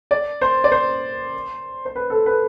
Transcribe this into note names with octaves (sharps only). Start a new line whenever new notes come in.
D5
C5
D5
C5
C5
B4
A4
B4